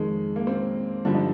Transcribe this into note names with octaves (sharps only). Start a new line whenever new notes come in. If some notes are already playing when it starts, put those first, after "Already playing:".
Already playing: F2 D#3 G#3
A#3
C4
G2 D3 F3 D4
D#4